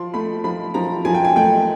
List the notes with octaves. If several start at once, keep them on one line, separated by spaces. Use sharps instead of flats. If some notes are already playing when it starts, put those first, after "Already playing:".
Already playing: F3 C6
A3 B5
F3 B5
F3 A#5
F3 G#5
G5
G#5
A3 G5